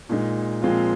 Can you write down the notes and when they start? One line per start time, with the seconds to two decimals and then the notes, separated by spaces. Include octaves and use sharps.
0.09 A#2 G#3 D#4
0.62 A#2 F3 G#3 C4 F4